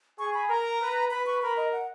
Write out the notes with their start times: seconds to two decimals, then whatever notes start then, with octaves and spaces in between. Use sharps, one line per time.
0.18 G#4 C#6
0.34 B5
0.50 A#4 A#5
0.80 B4
1.10 B4 B5
1.26 C#6
1.42 A#4 B5
1.57 D#5
1.72 F#5